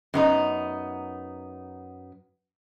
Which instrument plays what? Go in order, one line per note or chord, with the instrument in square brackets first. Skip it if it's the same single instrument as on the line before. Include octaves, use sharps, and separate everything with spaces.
[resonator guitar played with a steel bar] F#2 B3 D#4